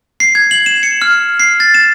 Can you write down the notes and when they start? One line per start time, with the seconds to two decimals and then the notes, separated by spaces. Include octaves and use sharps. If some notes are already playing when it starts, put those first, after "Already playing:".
0.20 C7
0.35 G#6
0.51 F#7
0.66 E7
0.83 C#7
1.02 F6
1.40 C7
1.60 A6
1.74 E7